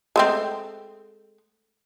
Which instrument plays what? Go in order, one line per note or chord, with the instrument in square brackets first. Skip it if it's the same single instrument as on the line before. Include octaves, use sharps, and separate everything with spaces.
[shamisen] G#3 A3 C4